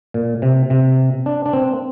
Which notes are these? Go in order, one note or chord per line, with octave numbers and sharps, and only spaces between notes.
A#2
C3
C3
D4
D4
C4